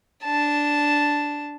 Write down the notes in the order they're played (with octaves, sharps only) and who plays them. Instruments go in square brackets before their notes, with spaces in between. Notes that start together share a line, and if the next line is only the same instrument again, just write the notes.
[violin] D4 A5